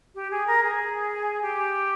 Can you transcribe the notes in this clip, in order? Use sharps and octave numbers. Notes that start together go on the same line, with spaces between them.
G4
G#4
A#4
G#4
G4